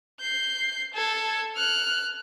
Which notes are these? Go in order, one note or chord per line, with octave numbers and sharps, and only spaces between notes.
G6 C7
A4 G#6
F6 F#6